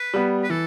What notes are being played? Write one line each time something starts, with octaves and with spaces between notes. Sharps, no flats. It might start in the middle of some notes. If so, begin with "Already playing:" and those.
Already playing: B4
G3 B3
B4
E3 A4